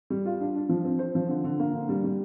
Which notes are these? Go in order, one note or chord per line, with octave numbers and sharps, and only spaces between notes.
G3
F4
D4
D4
F3
C4
C5
F3
D3
D3
A#3
D3
G3
G3